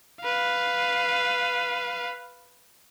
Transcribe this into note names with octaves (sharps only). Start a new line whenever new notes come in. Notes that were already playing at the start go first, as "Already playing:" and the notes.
B4 F5